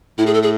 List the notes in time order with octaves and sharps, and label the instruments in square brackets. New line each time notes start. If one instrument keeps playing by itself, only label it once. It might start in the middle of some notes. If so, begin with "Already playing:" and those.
[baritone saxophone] A2 [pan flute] E4
[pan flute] G#4
A4
G#4